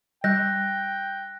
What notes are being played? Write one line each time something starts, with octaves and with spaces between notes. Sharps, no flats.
G3 G5 F#6 G6 A#6